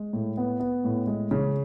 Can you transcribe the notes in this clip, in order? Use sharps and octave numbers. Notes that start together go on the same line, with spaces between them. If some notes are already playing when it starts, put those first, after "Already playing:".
Already playing: G#3
A2
B3
B3
A2
G#3
C#3